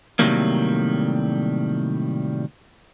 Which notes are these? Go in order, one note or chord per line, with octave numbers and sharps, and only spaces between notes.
A2 C3 D#3 F#3 G3 A#3